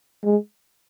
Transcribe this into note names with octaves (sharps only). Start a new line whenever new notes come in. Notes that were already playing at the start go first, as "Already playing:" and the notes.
G#3